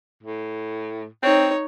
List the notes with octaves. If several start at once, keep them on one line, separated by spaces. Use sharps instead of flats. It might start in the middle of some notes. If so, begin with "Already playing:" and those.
A2
C4 D#4 C#5